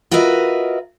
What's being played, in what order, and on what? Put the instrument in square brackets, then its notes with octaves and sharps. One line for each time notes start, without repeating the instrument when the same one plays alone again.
[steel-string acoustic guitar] F4 F#4 A#4 B4 D#5 E5